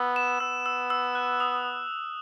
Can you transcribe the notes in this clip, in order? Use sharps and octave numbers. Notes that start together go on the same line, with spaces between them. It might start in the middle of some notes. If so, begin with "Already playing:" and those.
Already playing: B3 E6
E7
B3 E6
E6
E6
F#6
D#6